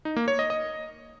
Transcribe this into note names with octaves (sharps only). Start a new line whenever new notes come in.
D#4
A#3
C#5
D#5
D#5